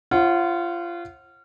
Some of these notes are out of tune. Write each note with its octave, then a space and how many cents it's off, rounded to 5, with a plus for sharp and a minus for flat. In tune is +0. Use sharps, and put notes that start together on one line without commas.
F4 -25 C5 +45 F#5 +0